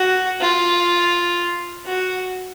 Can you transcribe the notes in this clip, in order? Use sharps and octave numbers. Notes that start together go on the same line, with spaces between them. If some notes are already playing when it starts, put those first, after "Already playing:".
Already playing: F#4
F4
F#4